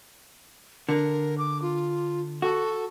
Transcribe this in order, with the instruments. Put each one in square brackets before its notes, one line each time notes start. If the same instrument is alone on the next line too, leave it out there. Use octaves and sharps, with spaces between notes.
[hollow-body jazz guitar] D3 [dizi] A#4
[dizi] D6
F4
[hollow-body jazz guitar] F#4 [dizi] A4